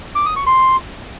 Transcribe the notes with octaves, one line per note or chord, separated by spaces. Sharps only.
D6
D#6
C#6
C6